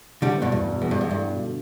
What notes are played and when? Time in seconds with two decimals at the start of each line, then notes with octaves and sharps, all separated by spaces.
0.22 A2 D3 G3
0.37 G2 B2 B3
0.52 E2 G2
0.67 B2
0.81 E2 B3
0.91 G2
0.96 E2 E4
1.11 G2 A3
1.26 B2
1.41 D3